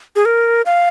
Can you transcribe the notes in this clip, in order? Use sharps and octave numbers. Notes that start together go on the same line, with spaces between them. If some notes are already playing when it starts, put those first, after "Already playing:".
G#4
A#4
F5